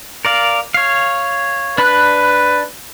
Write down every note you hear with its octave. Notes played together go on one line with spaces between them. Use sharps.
A#4 D5 F5
C#5 F5
D4 B4 B5 F#6